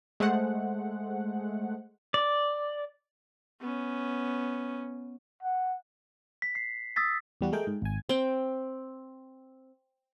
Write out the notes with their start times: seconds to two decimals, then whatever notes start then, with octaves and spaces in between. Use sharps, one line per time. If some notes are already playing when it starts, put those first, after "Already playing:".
0.20 G#3 A3 C5 F#5
2.14 D5
3.60 B3 C#4
5.43 F#5
6.42 B6
6.55 C7
6.96 D#6 E6 A6 B6
7.41 E2 G3 F#4
7.52 G#3 A3 G#4 A#4 G5
7.67 G#2
7.82 G#1 G#5
8.09 C4 G5